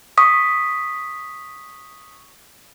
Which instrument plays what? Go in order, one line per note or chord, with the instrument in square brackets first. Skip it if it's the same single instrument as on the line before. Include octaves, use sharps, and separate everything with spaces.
[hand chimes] C#6 D#6 B6